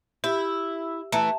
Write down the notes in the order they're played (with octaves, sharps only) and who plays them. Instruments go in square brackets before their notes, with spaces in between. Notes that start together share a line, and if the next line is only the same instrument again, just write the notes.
[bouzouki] E4 [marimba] G4
[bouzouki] E3 A3 [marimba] E5 A5 A#5